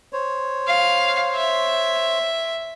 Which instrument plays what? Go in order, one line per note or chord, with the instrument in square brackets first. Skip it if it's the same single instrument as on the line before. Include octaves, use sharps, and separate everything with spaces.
[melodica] C5 C#5
[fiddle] F5
E5